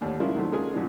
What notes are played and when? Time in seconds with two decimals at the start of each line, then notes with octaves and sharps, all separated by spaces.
0.01 D#2 A2 D3 D4
0.20 G3 G#3 A#3 C#4 E4 F4
0.35 D#3 F#3 A3 C4
0.52 G#3 A#3 C#4 F4 G#4
0.74 F#2 A#2 E3 F3 G3